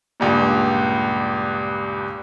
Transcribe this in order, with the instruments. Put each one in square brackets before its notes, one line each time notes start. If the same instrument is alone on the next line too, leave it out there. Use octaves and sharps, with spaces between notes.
[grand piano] C#2 G2 A#2